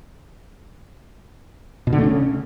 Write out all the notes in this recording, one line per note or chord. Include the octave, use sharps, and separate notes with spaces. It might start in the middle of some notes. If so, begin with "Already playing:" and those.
B2
D3
A3
C#3